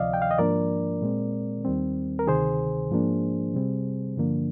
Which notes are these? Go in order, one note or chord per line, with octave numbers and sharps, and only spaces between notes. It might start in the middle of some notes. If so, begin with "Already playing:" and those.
Already playing: D2 C3 F3 D5 D#5 F5
G5
F5
D#5
G#2 F3 A#3 D4 A#4 D5
A#2 G#3 C4
D#2 D#3 G3 C4
A#4
D2 C3 D#3 G#4 C5
G#2 F3 A#3 D4
C3 G3 C4
G2 D3 F3 A#3 D4